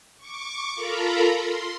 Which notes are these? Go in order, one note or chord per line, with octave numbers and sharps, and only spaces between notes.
C#6 D6
F4 A4 A#4 A#5 B5
C6